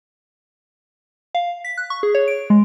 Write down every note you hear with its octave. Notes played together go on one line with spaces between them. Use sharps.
F5
B6
F#6
C#6
G#4
C#5
D7
G#3